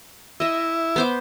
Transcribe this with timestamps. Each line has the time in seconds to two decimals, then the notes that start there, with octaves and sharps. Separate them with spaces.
0.40 E4 D#5 E5
0.96 B3 C5 D6